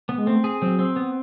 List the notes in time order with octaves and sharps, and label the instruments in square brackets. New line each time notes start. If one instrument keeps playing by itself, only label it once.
[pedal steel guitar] B3
[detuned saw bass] G#3
[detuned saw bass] A3 [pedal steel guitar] C4
[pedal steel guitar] G#4
[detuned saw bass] F#3 [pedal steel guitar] C4
[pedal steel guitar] C4
B3